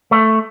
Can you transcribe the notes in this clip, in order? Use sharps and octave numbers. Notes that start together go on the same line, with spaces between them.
A3